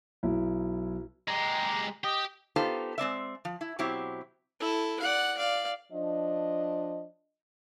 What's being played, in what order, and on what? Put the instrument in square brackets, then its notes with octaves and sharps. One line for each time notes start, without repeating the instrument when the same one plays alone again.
[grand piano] B1 E4
[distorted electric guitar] G#3 G4 [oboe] A#5
[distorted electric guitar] G4 [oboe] D#5
[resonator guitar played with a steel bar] B3 D#4 F4 G4 A4 C5
G#3 C4 D5 E5
F3
E4
B2 F#3 C4 E4 G4
[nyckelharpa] E4 A4
D5 F#5
D5 F5
[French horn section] F3 D4 D#5